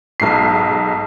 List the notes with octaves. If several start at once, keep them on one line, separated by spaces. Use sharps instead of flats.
B1 G#2 C7